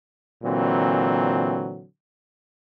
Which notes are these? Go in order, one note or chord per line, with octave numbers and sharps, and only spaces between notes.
A#2 D3 E3 F#3 C4